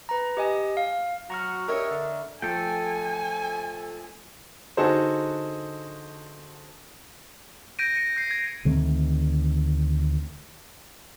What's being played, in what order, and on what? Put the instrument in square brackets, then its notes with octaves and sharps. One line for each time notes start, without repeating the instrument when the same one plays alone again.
[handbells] B4 A#5
G4 D#5 G#5
F5
[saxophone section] F#3 F#4 [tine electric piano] A#5 C#6 F6
[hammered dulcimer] D4 D#5 E5 [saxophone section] G4 C#5 [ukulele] A#4
[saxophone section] D3
[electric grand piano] F3 A3 [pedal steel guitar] A4 G5 [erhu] G#5
[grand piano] D3 D#4 F#4 G#4 A4 C5
[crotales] G6 A#6 D7 D#7
C#7 D#7
G6 C7
G#6 A#6
[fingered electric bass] D2 D#3 A3 C4